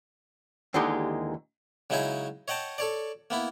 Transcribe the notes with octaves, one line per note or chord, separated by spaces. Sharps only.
D#2 D3 E3 G#3 D#4 G4
C#3 F#3 G#3 D#4 E4 G#4
C#5 D#5 F#5 G5 A5
A4 C#5 D5
A#3 B3 E4